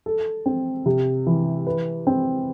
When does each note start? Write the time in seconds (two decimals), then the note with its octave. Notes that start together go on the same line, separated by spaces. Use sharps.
0.06 A4
0.46 C4
0.86 C3
1.27 E3
1.67 B4
2.07 C4